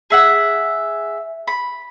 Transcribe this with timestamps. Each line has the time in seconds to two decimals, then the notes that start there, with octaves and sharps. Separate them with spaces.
0.10 G#4 E5 F#5
1.47 B5